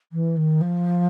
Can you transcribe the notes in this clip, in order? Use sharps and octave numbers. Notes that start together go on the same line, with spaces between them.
E3
D#3
F3